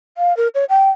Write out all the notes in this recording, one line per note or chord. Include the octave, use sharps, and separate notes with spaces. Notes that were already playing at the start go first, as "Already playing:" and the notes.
F5
A#4
C#5
G5